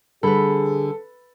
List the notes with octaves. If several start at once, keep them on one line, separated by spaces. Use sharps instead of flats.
D3 G3 G#4 A4 B4 B5